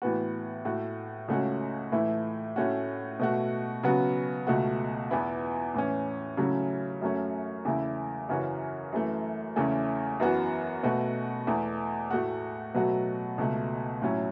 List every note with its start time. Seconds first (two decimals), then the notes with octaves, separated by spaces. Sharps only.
0.02 A2 E3 B3 F#4
0.65 A2 A3 F#4
1.28 C#2 C#3 A3 C#4 F#4
1.92 A2 E3 A3 E4
2.56 A2 A3 C#4 F#4
3.19 B2 A3 F#4
3.83 C#3 F#3 B3 F#4
4.47 C#2 B2 A3 F#4
5.10 E2 E3 B3 E4
5.74 A2 E3 C#4
6.37 C#3 F#3 A3 C#4 E4
7.01 F#2 F#3 A3 C#4
7.65 E2 C#3 A3 E4
8.29 F#2 C#3 E3 C#4 F#4
8.92 F#2 E3 A3
9.56 E2 C#3 A3 C#4 E4
10.20 F#2 E3 B3 F#4
10.83 B2 A3 F#4
11.47 E2 E3 A3
12.11 A2 A3 F#4
12.74 B2 F#3 A3 F#4
13.38 C#2 B2 A3
14.02 A2 F#3 C#4 E4